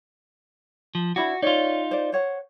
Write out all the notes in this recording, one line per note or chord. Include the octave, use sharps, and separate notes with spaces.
F3
D4 E4 F#4 B5
C#4 D#4 F4 C#5 D5
C5 D5
C5 C#5 F#5